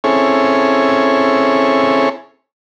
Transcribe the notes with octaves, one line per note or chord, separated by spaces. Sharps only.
C4 C#4 E4 G#4 A4 C#5